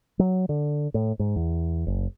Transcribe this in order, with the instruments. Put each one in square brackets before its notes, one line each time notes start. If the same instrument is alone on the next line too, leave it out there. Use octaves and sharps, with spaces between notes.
[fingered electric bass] F#3
D3
A2
G#2
E2
F#1